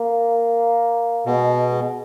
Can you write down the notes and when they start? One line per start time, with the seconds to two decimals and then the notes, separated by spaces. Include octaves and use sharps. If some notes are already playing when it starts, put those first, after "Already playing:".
Already playing: A#3
1.26 B2 G#3
1.72 G#3